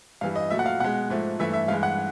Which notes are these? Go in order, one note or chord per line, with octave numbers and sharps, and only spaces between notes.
G2 E3 G3 F5
D#5
A#2 F#3 A3 E5
F#5
F5
B2 G#3 F#5
G#2 F3 A3
G2 E3 A3 E5
E5
G2 E3 G#3 F5
F#5